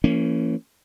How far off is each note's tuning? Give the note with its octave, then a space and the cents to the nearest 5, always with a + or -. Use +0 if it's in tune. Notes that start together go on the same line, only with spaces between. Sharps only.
E3 +35 A#3 -25 C#4 +0